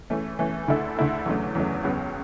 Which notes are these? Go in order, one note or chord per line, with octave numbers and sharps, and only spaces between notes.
E3 A3 C#4
E3 A3 C#4
D2 D3 A3 E4 A4
D2 D3 A3 E4 A4
E2 C#3 F#3 A3
E2 C#3 F#3 A3
C#2 C#3 F#3 B3